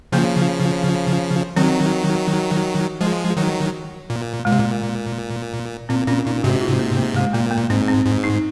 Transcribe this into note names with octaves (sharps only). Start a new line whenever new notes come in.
C#3 F3 A#3
D#3 F#3 C4
F3 G#3
D#3 F#3
A#2
A#2 G#3
C3
A#2
A#2 C4
A#2 C#4
A#2 D#4
G#2 C3 F#4
F4
A#3
A#3
G#3
A#2 A#3
A#3
G#2 C4
C4
G#2
D#4